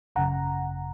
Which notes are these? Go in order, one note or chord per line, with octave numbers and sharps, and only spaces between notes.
G#1 F#2 C#3 F#5 A#5